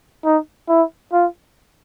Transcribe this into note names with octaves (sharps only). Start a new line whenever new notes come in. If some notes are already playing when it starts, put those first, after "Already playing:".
D#4
E4
F4